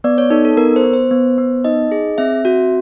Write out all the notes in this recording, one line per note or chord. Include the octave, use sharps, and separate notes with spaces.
B3 D5
C#5
D#4 A4
A4
B3 A#4
C5
B3
C5
B3
B3
D#4 D#5
G#4
C4 E5
F#4